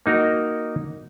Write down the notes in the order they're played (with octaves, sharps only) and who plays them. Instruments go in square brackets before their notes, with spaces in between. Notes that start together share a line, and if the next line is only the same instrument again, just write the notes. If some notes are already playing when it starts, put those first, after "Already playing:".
[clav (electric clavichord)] A#3 D#4 F#4 A#4